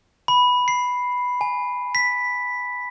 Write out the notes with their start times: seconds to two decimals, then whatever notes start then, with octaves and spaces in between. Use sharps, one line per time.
0.28 B5
0.68 C7
1.41 G#5
1.95 B6